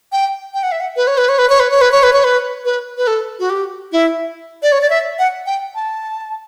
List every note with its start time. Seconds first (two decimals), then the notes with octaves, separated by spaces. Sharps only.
0.12 G5
0.54 G5
0.63 F#5
0.72 E5
0.81 F#5
0.96 B4
1.07 C#5
1.18 B4
1.29 C#5
1.39 B4
1.50 C#5
1.60 B4
1.71 C#5
1.81 B4
1.92 C#5
2.03 B4
2.13 C#5
2.24 B4
2.65 B4
2.98 B4
3.07 A4
3.39 F#4
3.50 G4
3.92 E4
4.63 D5
4.72 C#5
4.81 D5
4.90 E5
5.19 F#5
5.46 G5
5.75 A5